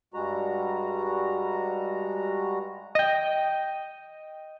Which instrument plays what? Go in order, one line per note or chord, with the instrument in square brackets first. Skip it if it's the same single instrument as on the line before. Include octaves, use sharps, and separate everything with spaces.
[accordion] G2 G3 G#3 F#4 A#5
[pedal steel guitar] D#5 G5